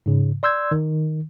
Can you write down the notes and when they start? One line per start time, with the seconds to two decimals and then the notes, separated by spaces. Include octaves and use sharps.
0.06 G#2 C#3
0.43 D5 C6 E6 G6 G#6
0.71 D#3